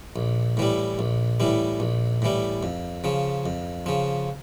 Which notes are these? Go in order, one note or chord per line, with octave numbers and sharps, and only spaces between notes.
A#1
A2 E3 G3
A#1
A2 E3 G3
A#1
A2 E3 G3
F2
C#3 F3
F2
C#3 F3